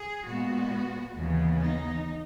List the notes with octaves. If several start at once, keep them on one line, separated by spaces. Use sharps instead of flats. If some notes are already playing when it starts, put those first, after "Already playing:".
Already playing: G#4
A#2 G#3 B3 F#4
D#2 C#3 E3 B3
D#4